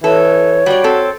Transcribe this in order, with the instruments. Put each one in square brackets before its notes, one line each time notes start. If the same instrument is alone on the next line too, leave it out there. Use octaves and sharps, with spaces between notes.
[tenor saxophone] E3 [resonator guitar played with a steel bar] A4 [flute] C#5
[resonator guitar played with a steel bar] G3 D5 [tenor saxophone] F#4
[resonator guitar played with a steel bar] C4 A4